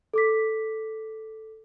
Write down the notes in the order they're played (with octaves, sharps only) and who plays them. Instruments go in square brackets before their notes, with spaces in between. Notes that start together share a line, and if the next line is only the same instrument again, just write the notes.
[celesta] A4 D6 B6